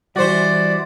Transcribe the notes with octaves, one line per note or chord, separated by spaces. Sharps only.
E3 G3 F#4 C5 D5